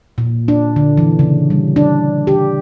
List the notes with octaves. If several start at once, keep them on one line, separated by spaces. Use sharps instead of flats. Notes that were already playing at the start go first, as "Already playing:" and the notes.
A#2
D4
D3
E3
C#3
G3
D4
G4